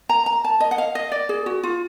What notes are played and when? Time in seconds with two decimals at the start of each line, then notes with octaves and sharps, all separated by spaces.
0.09 A#5
0.26 A#5
0.44 A5
0.60 D#5
0.71 F#5
0.78 F5
0.95 D#5
1.12 D5
1.29 G#4
1.46 F#4
1.63 F4